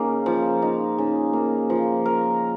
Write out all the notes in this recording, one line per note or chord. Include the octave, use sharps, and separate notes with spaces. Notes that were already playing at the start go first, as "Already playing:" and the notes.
Already playing: C#3 A#3 D#4
F3
D#4
C#3
A#3
F3
A#4